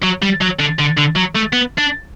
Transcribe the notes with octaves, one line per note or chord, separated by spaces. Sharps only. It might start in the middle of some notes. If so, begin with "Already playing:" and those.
F#3
G3
F#3
D3
D3
D3
F#3
A3
B3
D4